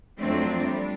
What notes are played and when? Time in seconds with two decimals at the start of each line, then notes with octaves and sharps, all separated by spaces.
0.19 F2 F#3 A3 C4 D4
0.59 G3 D4